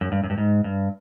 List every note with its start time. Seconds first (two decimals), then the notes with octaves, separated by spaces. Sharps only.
0.01 F#2
0.12 G2
0.24 F#2
0.30 G2
0.38 G#2
0.64 G2